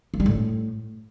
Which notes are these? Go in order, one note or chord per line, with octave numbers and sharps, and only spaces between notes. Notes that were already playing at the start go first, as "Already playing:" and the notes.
A#3
G3
A2